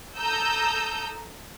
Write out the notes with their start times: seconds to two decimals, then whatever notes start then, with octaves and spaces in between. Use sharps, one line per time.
0.17 A4 A#5 D#6 E6 G6